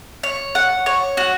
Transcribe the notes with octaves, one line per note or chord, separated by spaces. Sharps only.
C#5
F#5
C#5
F#4